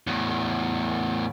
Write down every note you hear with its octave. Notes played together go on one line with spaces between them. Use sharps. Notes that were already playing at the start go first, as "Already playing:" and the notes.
E2 A2